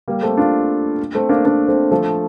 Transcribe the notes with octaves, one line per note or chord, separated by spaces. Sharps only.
G3 A#3
A3 C4
D4 F4
A3 C4
A#3 D4
A#3 D4
A3 C4
F3 A3